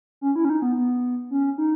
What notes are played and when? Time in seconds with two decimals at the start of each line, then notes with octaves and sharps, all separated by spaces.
0.21 C#4
0.36 E4
0.45 C#4
0.50 D#4
0.62 B3
0.77 B3
1.31 C#4
1.58 D#4